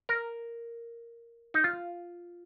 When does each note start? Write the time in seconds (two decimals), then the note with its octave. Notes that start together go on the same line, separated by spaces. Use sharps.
0.09 A#4
1.54 D#4
1.64 F4